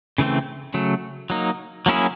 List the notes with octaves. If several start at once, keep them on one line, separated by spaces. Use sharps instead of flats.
C#3 E3 A3 C4
C#3 F#3 A3
F#3 A#3 D#4
F#3 A#3 C#4 E4 G#4